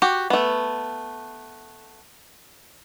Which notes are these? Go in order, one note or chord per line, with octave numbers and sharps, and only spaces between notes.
F#4 G4
A3 B3